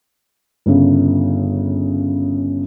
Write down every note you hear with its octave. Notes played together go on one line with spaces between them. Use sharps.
G1 C#3